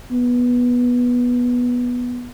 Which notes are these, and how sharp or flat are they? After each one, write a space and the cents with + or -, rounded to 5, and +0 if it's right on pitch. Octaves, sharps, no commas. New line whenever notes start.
B3 -10